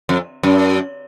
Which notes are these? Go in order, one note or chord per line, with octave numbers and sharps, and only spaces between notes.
F2
F#2